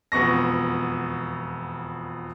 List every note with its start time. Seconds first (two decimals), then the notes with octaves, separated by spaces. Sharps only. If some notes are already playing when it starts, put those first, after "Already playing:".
0.12 E1 F2 B3 C#6 A#6